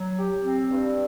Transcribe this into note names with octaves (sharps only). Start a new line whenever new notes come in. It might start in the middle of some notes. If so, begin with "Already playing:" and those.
Already playing: F#3
G4
C4
G2